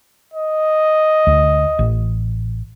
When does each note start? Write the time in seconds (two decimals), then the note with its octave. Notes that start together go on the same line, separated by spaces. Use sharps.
0.34 D#5
1.27 D2
1.79 A1